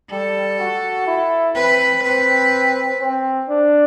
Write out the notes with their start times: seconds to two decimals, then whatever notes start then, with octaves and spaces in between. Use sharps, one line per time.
0.11 G3 A4
0.59 F#4
1.07 E4
1.55 C4 B4
2.04 C4 B4
3.01 C4
3.49 D4